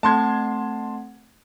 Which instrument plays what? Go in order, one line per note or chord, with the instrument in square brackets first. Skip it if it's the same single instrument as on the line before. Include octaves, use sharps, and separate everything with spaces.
[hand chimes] A3 C4 F#5 [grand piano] A5 C6 G#6